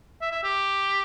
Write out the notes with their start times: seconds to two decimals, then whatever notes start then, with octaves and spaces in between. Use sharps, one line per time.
0.22 E5
0.32 E5
0.44 G4